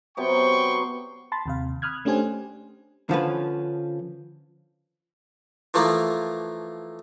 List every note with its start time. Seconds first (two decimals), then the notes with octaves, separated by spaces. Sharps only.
0.17 C3 F#3 B3 G5 C6 C#6
1.32 A5 B5 C6 A6
1.46 D#2 C3 F5
1.82 B5 D#6 F6 F#6 G#6
2.05 A3 C#4 D4 G4 C5 G#5
3.09 D3 F3 C#4 B4
5.74 E3 F3 A3 A#3